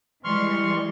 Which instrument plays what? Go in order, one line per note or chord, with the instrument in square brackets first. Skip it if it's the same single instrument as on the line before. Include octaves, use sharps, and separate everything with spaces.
[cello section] E3 G3 G#3 [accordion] C6 C#6 F6